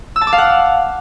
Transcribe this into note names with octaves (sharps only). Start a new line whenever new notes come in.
E6
A5
D6
F5
F#5